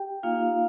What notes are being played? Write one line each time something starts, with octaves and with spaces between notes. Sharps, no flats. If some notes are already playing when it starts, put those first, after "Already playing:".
Already playing: G4 G5
A#3 D#4 F4 F5